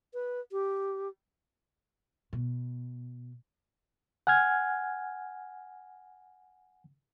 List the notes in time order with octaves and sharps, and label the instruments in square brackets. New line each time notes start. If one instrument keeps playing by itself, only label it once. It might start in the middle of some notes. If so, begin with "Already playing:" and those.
[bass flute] B4
G4
[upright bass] B2
[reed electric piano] F#5 G#5 F6 G#6